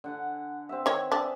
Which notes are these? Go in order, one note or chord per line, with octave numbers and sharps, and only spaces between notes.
D3 F#5 G#5
C4 B4 E5
D#3 C#5
D4 G#4 E5